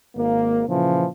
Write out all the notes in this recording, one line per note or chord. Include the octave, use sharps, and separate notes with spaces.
G#1 A#3
A#2 C#3 E3 F3